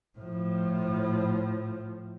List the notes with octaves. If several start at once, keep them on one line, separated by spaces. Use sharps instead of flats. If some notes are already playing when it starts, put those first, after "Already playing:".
A2 F3